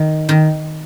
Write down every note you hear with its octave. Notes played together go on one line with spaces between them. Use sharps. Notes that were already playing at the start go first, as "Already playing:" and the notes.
Already playing: D#3
D#3